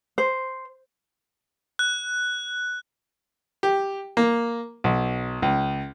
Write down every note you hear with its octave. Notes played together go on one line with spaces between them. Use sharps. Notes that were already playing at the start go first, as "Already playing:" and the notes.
C5
F#6
G4
A#3
B1
C#2